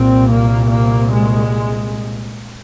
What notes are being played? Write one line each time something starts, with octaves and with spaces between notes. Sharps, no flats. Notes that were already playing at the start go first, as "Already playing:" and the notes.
Already playing: C2 A#2 C4
A#3
A#3
G#3